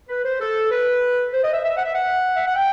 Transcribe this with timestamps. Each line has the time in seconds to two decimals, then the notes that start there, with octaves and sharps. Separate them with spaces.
0.09 B4
0.25 C5
0.40 A4
0.71 B4
1.32 C5
1.43 D#5
1.53 E5
1.63 E5
1.77 F#5
1.84 E5
1.94 F#5
2.36 E5
2.46 F#5
2.56 G5